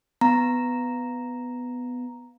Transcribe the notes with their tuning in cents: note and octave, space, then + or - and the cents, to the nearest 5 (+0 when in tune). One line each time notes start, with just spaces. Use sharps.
B3 +10 A#5 +0